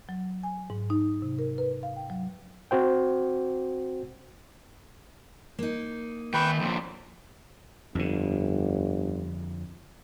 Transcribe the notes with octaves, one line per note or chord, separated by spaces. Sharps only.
F#3
G#5
G#2
D#4
C3
A#4
B4
F5
G5
F#3
C4 F#4 C5 G5
A#3 D#4
D#3 B4 G5 B5 C#6
F2 A#2 C4
G1 F2 D3